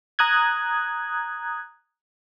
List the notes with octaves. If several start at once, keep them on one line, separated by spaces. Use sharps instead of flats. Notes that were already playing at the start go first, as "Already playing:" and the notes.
A#5 D#6 F#6 G#6